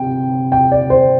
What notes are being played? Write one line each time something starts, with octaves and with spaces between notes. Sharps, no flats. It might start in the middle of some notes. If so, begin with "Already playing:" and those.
Already playing: C3 G5
G5
D5
C5